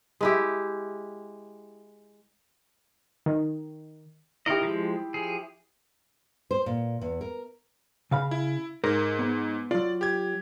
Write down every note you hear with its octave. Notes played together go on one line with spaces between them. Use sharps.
G#3 E4 G4
D#3
D#3 E4 G4 A#4 D#5
F3 G#3
F3 G#4
C5
A#2
E2
A#4
C#3 F5 B5
E4
G#2 A#4
B3
F#3 F4 D5
G4 G#6